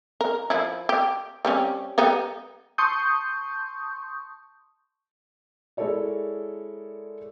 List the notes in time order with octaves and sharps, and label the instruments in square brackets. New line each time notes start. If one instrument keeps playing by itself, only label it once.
[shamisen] A#4
F3 E4
G4
G3 C4 C#4
G3 B3 D#4
[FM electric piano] A5 C6 C#6 D#6 G6
[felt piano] G#3 E4 A4 A#4 C#5 D5